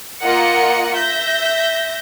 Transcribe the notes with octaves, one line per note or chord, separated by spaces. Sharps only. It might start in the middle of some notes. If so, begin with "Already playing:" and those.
A#3 F4 A#4 D#5 F#5 C#7
E5 G6 A#6